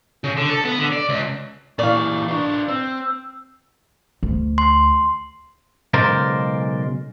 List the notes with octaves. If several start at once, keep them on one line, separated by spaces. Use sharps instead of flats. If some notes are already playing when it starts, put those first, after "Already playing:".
C#3
D3
A4
B3
D3
D5
C#2
A#2 E3 D5 F5 C#6
D4 F4
C4 E6
D2
C6
B1 C#3 G#3 A#4 C5 D5